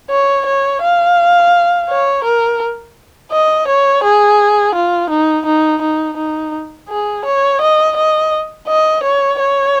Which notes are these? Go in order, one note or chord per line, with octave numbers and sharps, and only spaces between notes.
C#5
C#5
F5
C#5
A#4
D#5
C#5
G#4
F4
D#4
D#4
D#4
D#4
G#4
C#5
D#5
D#5
D#5
C#5
C#5